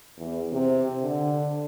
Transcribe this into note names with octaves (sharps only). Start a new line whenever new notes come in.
E2
C3
D3